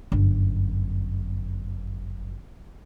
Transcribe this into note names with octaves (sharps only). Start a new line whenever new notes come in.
G1 F#2